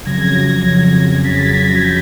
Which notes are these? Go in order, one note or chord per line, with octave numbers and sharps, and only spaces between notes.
F2 C#3 F#3 G#6 A#6
G#6 A#6
F2 C#3 F#3
F2 C#3 F#3 A6 B6
G#6 A#6
C#3 F#3 G6 A6